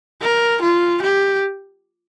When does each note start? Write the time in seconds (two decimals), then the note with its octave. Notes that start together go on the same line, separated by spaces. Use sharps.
0.21 A#4
0.62 F4
1.02 G4